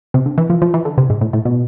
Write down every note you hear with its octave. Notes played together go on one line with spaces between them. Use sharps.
C3
D3
E3
F3
F3
E3
D3
C3
G#2
A2
A2
B2